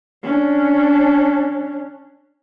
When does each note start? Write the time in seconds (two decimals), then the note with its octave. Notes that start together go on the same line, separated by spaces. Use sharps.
0.23 C#4 D4